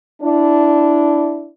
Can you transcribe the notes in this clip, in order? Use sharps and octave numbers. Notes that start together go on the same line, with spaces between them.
D4 E4